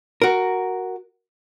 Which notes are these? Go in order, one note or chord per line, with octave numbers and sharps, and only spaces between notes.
F#4 A#4